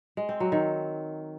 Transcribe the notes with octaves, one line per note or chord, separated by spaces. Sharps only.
G#3
C4
F#3
D#3